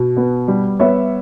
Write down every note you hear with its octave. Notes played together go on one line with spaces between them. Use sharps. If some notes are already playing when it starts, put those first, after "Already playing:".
Already playing: B2
B3
G3
B3 C#5 E5